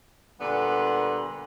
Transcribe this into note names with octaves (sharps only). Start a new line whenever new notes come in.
A#2 D3 G3 B3